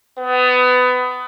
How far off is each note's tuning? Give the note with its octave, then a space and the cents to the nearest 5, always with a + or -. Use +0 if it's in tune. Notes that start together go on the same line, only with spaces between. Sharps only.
B3 +25